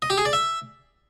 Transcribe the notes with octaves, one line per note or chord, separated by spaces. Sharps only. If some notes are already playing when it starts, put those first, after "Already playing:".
D#5
G4
G#4
D5
E5